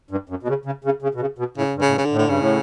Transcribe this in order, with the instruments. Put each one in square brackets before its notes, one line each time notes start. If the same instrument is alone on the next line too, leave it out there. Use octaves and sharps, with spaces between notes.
[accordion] G2
F#2
B2
C#3
C#3
C#3
C#3
B2
C#3
B2
[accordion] A2 [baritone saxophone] C#3
[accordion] G2
[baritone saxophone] C#3
[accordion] A2
G2
[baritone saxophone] C#3
D3
[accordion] A2
[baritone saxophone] D3
[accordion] G2 [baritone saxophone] C#3
[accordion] A2